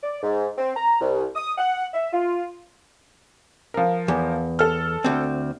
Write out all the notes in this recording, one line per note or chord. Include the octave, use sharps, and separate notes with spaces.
D5
G#2
C4
A#5
C2
D#6
F#5
E5
F4
F3 A#4
E2
A4 F6
D2 C4